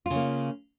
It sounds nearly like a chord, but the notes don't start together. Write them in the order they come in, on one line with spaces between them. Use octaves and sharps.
F4 C#3 A#3